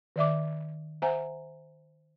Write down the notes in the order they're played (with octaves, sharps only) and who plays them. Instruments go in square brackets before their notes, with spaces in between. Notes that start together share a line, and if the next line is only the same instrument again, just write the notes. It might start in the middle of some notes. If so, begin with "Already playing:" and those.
[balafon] D#3 D5 E5 D6
C5 E5 F#5 G#5 A#5